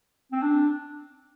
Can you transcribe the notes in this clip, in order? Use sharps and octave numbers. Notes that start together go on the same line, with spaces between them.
C4
D4